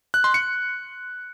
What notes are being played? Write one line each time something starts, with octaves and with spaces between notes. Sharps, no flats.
F#6
C6
C#7